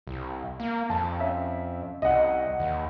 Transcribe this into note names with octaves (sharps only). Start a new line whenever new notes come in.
C2
A#3
F2 A5
C#4 E5
C2 D#5 F#5
D#2